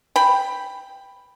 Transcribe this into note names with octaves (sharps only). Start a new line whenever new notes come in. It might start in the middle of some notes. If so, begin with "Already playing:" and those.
G5 B5